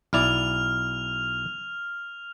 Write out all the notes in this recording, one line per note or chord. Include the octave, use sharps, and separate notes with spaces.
B1 E4 D5 F6 F7